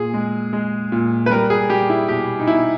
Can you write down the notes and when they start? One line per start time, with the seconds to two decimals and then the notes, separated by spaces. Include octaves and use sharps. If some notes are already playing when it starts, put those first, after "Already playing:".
Already playing: A#2 G#4
0.14 G#3
0.53 G#3
0.92 A#2
1.26 B4
1.30 G3 A#4
1.50 G#4
1.69 G3 G4
1.90 E4
2.09 B2 G4
2.40 D#4
2.47 B2 E4